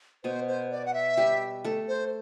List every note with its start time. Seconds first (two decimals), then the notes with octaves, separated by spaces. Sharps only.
0.24 B2 B3 C5
0.48 C5
0.71 D5
0.85 F#5
0.94 E5
1.17 G3 G4
1.64 A3 A4
1.88 C5